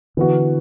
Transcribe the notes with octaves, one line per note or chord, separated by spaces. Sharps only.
D3 E3 B3 F#4